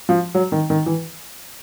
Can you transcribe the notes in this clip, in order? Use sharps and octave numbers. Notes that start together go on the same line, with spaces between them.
F3
F#3
D#3
D#3
E3